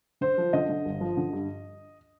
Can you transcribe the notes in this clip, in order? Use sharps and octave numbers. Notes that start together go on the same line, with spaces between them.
D3 C5
F3
D3 D#5
D3
G1
F3
D3
G2